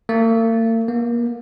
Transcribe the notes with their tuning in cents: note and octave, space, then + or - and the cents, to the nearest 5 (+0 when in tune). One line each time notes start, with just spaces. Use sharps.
A#3 -45
A#3 +30